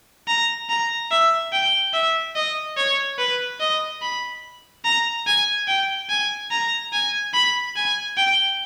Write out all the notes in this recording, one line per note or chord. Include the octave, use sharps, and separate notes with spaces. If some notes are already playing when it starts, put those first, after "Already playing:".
A#5
A#5
E5
G5
E5
D#5
C#5
B4
D#5
B5
A#5
G#5
G5
G#5
A#5
G#5
B5
G#5
G5